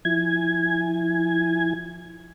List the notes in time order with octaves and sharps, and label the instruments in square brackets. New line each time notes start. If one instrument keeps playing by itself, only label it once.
[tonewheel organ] F3 E4 G#5 G#6